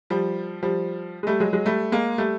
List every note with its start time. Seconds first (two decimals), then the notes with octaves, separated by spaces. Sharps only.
0.10 F3 G3
0.62 F3 G3
1.23 G#3
1.27 G3 A3
1.40 F#3 G#3
1.53 F#3 G#3
1.66 G3 A3
1.92 G#3 A#3
2.18 G3 A3